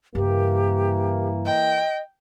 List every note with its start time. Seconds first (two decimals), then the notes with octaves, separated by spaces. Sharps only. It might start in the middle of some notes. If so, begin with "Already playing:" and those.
0.15 G2 C#3 E3 A#3 G4
1.46 D#5 G5